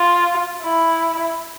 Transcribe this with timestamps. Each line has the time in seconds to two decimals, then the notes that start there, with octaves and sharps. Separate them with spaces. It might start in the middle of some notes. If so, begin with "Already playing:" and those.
Already playing: F4
0.62 E4